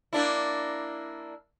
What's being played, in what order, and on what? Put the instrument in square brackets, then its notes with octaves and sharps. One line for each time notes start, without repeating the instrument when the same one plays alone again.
[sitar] A#3 D4 E4